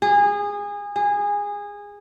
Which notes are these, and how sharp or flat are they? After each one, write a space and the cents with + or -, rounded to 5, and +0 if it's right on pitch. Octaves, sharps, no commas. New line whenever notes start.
G#4 -25
G#4 -20